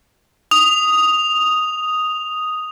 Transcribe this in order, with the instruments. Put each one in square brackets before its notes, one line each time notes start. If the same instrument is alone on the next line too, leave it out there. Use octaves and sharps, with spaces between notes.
[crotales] D#6 F7